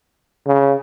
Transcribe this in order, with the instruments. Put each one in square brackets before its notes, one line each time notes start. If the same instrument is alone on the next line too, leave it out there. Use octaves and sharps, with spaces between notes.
[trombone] C#3